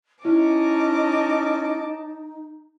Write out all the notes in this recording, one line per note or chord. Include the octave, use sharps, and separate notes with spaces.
C#4 D#4 E4 D#5 A5 D6